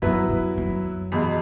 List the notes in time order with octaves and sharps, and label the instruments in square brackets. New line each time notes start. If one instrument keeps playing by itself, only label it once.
[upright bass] F#2 [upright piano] F#3 B3 E4 B4
[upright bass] F#2
F#2
[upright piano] E2 B2 G#3